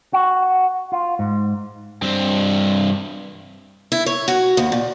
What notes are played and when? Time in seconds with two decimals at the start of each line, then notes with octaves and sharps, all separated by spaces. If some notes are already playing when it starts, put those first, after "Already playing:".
0.13 F#4
0.92 F4
1.19 G#2
2.02 G2 C4
3.92 E4
4.06 C#5
4.28 F#4
4.57 D#2
4.72 A#2